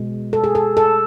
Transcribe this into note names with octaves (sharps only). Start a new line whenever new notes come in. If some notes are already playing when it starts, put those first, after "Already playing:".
Already playing: B2 G#3
A4
G#4
A4
A4